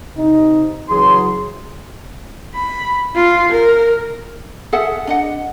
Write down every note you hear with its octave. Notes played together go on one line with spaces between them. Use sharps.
C3 D#4
C#3 E3 F#3 G#4 C6
B5
F4
A#4
G#4 A4 E5 F#5
D4 D#5 F#5